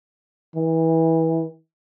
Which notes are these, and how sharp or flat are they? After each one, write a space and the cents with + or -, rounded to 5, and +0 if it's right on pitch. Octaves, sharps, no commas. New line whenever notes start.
E3 -25